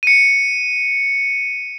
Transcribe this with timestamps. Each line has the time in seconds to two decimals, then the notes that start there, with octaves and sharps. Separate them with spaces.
0.03 C#7 D#7